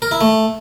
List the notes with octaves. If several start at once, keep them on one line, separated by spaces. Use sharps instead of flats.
A#4
E4
A3